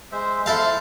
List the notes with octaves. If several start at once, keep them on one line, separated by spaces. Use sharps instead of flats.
G#3 C5 E5
E4 A4 C5 F5